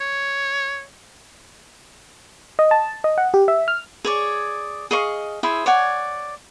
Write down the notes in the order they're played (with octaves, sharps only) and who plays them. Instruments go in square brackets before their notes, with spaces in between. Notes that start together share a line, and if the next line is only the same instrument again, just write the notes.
[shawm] C#5
[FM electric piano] D#5
A5
D#5
F#5
G4
E5
F6
[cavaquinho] G#4 C#5 D5
G#4 D#5 F5 C#6
E4 G#4 C5 E5
C#5 D5 F#5 G#5